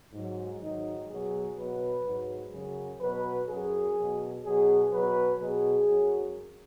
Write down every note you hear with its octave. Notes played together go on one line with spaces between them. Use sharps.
G#2 F#3
G#2 D#3 F#3 D#4
B2 F#3 G#4
B2 F#3 B4
G#2 F#3
F#2 C#3 F#3 G#4
B2 F#3 B4
F#2 F#3 G#4
B2 F#3
B2 F#3 G#4
B2 F#3 B4
B2 F#3 G#4
F#2 F#3